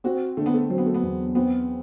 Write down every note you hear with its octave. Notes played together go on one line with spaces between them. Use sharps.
C4 F#4
D3 A3
B3
A3
F#3 C4
B3
A3
B3
E2
B3 C4